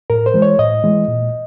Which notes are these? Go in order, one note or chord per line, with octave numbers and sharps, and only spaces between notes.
A2 A#4
C5
E3 G#3
C#5
A2 D#5
E3 G#3
A#2